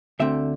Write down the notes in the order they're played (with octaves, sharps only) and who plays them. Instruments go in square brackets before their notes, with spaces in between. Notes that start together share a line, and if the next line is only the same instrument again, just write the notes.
[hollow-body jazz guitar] D2 D3 A3 C4 E5